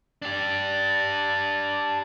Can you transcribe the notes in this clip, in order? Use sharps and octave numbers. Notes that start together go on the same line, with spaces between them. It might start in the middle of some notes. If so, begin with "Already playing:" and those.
D4 G4